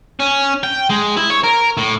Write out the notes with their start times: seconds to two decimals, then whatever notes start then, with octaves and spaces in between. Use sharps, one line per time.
0.20 C#4
0.63 G5
0.90 G#3
1.17 E4
1.31 C#5
1.44 A#4
1.77 A2